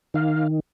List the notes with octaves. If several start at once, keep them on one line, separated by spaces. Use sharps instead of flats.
D#3 F5